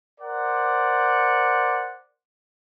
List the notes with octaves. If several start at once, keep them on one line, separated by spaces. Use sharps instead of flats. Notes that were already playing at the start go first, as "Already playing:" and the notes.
A#4 C5 D5 F#5